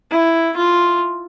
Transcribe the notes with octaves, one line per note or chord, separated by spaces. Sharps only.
E4
F4